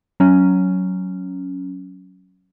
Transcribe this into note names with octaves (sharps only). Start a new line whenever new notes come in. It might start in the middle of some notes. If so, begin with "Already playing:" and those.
F#3 C#4